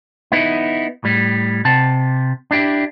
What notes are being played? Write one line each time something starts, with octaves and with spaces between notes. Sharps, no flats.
B3 D#4 E4
A2 G3
C3 A5
D4 E4 G4